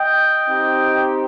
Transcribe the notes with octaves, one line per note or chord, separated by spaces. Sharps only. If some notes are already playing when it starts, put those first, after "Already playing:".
Already playing: D#5 G5
C4 D#4 G4